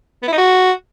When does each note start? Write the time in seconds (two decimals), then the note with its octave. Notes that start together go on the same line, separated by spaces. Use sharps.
0.23 B3
0.28 E4
0.33 D#4
0.38 F#4